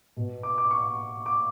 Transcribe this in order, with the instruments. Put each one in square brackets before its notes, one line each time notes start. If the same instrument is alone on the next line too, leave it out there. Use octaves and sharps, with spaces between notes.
[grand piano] B2
D6
D6
C#6
D6